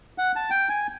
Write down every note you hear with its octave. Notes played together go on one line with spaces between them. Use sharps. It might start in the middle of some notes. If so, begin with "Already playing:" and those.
F#5
A5
G5
G#5